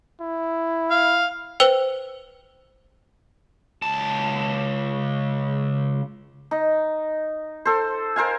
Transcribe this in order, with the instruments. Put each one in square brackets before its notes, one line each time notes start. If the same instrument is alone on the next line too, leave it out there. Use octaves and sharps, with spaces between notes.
[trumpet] E4
[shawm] F5
[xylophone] B4 C5 G5 E6 F7
[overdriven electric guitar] C#2 A5
[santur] D#4
A4 C5
A#4 C5 F5 G#5